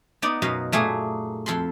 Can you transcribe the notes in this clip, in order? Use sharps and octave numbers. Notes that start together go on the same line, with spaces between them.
B3 D#4 D5
F#2 B2 D#5 F5
A#2 A3 A#3 G#4
F2 A4 B5 C6